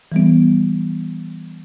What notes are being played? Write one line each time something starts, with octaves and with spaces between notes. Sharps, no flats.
E3 G3 B3